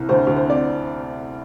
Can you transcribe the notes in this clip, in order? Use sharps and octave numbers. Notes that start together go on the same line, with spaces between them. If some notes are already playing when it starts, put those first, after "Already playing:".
Already playing: C2
D2 C5
D2
C5
C4 D5